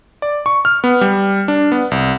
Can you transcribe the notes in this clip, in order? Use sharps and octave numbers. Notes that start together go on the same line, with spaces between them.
D5
C#6
F6
B3
G3
D4
B3
C2